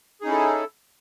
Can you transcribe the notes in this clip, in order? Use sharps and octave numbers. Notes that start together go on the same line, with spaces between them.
C#4 D#4 E4 G#4 A4